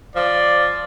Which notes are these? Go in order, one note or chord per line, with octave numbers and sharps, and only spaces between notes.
F3 D5